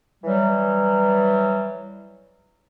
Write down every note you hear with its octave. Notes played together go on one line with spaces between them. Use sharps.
E3 F#3 G3